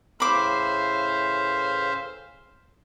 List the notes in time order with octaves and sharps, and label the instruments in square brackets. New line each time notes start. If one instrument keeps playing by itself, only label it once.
[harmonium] A2 C#3 E3 [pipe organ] C5 E5 F5 [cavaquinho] B5 D6